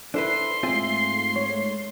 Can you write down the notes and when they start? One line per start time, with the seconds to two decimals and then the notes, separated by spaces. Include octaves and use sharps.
0.14 D4 E4 A4 B4 C5 C6
0.63 G#2 A3 C4 F4 G#4 E5
1.36 C#5